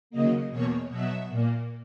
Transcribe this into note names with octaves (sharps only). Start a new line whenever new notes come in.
D#2 C#3 F#3 A#3 D#5
E2 B2 A#3 C#5
B2 F#3 B3 E5
A#2 A#3